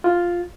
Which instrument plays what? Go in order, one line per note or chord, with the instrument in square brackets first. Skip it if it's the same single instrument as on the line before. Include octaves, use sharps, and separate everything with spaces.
[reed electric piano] F4